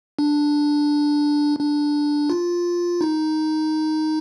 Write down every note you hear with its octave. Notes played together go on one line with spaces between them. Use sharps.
D4
D4
F4
D#4